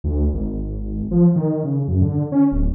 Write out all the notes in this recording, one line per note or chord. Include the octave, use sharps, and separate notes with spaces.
D2
G#1
F3
D#3
C#3
F#2
D3
C#4
D1